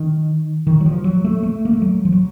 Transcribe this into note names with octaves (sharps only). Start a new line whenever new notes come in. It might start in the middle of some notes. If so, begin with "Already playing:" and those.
Already playing: D#3
D#3
F#3
F3
F#3
A3
A3
A#3
A3
F#3
F3
F#3